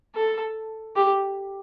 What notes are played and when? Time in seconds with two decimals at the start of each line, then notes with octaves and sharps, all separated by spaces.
0.15 A4
0.96 G4